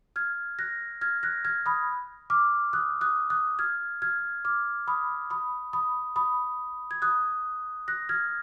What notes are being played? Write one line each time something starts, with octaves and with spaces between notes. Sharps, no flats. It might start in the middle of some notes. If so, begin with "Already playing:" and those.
F6 G#6
F#6 A#6
F6 G#6
F#6 A#6
F6 G#6
B5 D#6
D6 F6
D#6 F#6
D#6 F#6
D#6 F#6
F6 G#6
F6 G#6
D6 F6
B5 D#6
B5 D#6
B5 D#6
B5 D#6
G#6
D#6 F#6
F#6 A#6
F6 G#6